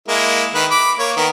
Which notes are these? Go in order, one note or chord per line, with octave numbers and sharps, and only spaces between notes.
G#3 A#3 E4
D#3 B4
B5 D6
A#3 C#5
D#3 B3 A#4